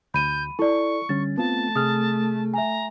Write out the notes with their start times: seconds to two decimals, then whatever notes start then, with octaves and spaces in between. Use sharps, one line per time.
0.14 D2 B5 G6 D#7
0.59 E4 A4 D5 C#6
1.09 D3 G3 C#4 A6
1.38 A3 B3 C4 F4 A5
1.76 C3 G#4 D#6 F6
2.54 E5 G#5 A#5